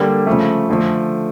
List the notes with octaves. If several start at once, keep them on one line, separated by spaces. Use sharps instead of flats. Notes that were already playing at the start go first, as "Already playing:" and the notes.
Already playing: D3 G3 A#3
C#3 F3 A3
D3 F3 A3